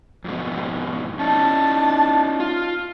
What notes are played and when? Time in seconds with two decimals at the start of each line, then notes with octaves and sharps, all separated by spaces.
0.24 F2 G#2 B2
1.20 C#4 D#4 E4 A5
2.40 F4